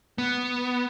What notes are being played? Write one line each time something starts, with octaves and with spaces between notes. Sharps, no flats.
B3